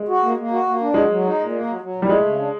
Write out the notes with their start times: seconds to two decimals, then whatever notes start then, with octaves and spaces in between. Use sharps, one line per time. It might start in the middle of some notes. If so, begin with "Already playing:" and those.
Already playing: G#3
0.08 F#4
0.23 A#3
0.37 A#3
0.51 F#4
0.66 A#3
0.81 D4
0.94 F#3 G#3
1.09 F#3
1.24 D#4
1.38 A#2
1.52 A#3
1.67 F#3
1.81 F#3
1.96 A#2
2.02 G3
2.09 G#3 A3
2.24 C#3
2.38 D4